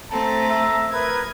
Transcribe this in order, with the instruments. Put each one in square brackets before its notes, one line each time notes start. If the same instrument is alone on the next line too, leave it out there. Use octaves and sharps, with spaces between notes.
[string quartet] A3 C4 A4 [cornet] A5 [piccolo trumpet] A#5
[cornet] E5
[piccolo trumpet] A#4 [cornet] B4 [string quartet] D#6 G#6